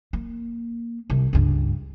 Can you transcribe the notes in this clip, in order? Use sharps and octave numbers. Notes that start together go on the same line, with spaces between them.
A#3
C2
C#2 G2